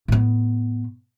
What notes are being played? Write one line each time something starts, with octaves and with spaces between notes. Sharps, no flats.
A2 B3